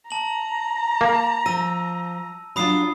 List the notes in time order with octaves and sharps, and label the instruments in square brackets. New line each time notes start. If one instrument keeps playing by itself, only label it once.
[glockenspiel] A5 F#7 [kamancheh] A#5
[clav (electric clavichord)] A#3
[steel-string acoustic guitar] F3 [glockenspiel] E6 A#6 D#7
[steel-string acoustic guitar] F#3 D4 F4 [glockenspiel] B5 D#6 C7